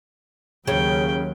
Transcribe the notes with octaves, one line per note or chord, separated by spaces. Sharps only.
D#2 C#3 F#3 G5